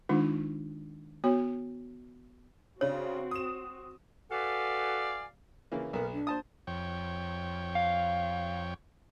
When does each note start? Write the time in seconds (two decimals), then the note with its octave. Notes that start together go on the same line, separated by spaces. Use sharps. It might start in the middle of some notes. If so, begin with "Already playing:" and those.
0.09 D#3 G#3 D4 D#4 F4
1.24 B3 F#4 C#5
2.81 C#3 C4 D4 F#4 C#5
3.31 D#6 E7
4.30 F#4 A4 B4 D5 F5 G#5
5.72 C#3 E3 A#3
5.93 B1 B3 A#4
6.13 D4
6.27 C5 A5 D#6
6.67 F2 C#5 G5
7.75 F5